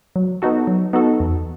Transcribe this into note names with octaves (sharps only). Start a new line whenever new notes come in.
F#3
B3 D#4 F#4 A4
F#3
B3 D#4 F#4 A4
E2